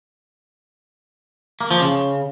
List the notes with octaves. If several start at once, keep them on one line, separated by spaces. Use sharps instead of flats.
A#3
F3
C#3